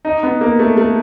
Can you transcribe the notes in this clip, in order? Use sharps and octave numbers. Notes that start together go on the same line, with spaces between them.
D#4
B3
A#3
A3
A3